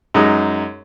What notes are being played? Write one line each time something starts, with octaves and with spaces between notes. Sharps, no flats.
F#2 G#3 D#4